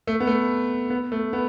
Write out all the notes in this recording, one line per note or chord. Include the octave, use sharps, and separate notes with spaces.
A3
B3
A3
B3
A3
B3